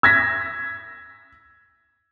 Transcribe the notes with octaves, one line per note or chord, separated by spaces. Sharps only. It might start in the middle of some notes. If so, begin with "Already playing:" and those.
E6 G#6 A#6 B6